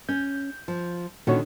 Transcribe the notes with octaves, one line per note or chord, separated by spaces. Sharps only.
C#4 G6
F3
A#2 D3 D#3 C#4 F#4 C#5